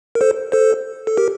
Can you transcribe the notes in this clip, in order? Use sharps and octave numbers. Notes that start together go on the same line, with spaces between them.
A#4
A4 C5
A4 C5
A4
G4 A#4